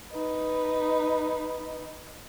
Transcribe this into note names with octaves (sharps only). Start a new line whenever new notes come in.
D#4 B4